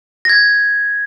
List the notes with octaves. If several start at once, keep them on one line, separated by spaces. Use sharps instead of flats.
G#6 A#6